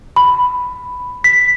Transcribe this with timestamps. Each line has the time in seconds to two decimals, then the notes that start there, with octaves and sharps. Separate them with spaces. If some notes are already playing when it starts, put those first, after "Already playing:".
0.16 B5
1.24 B6